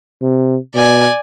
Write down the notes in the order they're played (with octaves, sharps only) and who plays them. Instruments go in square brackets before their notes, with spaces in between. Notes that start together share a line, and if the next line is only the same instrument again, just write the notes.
[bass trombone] C3
[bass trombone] B2 [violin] D5 G#5